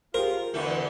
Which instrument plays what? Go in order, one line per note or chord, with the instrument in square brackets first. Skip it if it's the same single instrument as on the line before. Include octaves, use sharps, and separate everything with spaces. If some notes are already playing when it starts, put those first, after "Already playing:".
[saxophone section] F4 [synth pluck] G4 G#4 C5 [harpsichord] A#4
[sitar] E2 D3 A3 [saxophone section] B2 E3